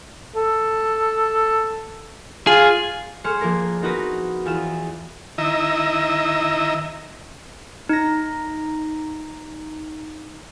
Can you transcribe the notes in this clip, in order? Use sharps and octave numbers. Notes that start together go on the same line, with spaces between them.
A4
F4 G#4
A3 G#4 C5 F6 C#7
F3 A#3 D4 A#4
B3 C4 D#4 F#4 A#4 B4
E2 F4 E7
D#3 E4 D#5 E5 A#5
D#4 A#6